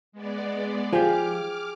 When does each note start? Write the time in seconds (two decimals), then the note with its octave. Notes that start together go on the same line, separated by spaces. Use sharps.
0.12 G#3 B3 D5
0.93 F3 G4 G#4 D6 F6